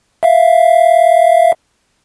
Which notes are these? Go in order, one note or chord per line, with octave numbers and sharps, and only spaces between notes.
E5 F5